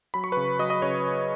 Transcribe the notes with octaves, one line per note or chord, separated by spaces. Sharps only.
F#3 B5
C#6
C#3 B4 B5
F#3 D#5 D#6
D#5 D#6
C#3 C#5 C#6